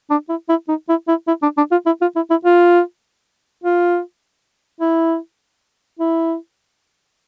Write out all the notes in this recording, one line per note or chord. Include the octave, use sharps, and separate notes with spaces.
D4
E4
E4
D#4
E4
E4
E4
D4
D4
F4
E4
F4
E4
E4
F4
F4
E4
E4